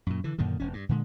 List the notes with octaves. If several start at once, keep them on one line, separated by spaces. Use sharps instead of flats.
F#2 A#2
D3 E3
F#2 A#2 D3 D#3
E1 C#4
G2
A#2 D3 G#3